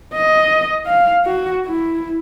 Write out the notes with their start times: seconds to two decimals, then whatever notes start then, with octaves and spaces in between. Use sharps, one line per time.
0.15 D#5
0.86 F5
1.25 F#4
1.66 E4